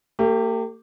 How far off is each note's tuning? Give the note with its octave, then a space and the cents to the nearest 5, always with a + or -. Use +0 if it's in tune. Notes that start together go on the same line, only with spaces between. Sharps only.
A#3 -45 G4 +0